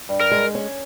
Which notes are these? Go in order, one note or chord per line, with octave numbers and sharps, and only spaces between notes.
G2
A#4
G#3
C#4